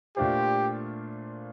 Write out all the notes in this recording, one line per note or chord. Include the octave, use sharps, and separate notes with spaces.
A#2 A3 D4 F4 G4 C5